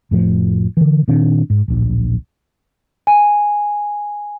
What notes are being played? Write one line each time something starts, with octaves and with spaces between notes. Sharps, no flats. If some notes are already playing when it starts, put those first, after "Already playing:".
F1 A2 F3
D3 E3
A#2 D#3 C4 D4
G#2
D1 A#1
G#5